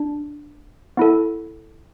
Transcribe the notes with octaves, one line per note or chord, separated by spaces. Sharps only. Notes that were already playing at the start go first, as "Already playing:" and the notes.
Already playing: D4
B3 E4 A4